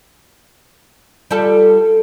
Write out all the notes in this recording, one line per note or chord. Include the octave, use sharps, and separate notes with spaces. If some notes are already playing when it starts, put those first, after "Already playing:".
G3 F4 A4